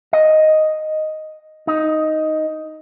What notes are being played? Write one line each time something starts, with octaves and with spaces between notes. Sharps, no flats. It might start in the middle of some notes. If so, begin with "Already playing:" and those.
D#5
D#4